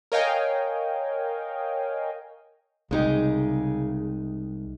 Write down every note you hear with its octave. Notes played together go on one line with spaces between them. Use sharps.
A#4 C#5 D#5 F5 G5 G#5
C2 C#3 G#3 D#4 G4